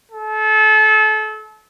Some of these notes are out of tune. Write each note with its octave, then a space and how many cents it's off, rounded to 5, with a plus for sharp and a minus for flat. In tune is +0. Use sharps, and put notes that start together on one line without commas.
A4 -30